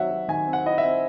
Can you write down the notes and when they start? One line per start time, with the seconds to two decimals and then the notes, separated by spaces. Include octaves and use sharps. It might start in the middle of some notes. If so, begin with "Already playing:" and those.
Already playing: D#3 F#3 C4 E5 F#5
0.11 F#3
0.28 D#3 G#5
0.47 C4
0.53 F#5
0.66 E4 D#5
0.78 E5
0.83 C4